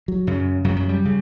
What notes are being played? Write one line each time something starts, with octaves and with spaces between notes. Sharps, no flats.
F#3
F#2 C#3
F#2 C#3 F#3
F#3
G3
C#3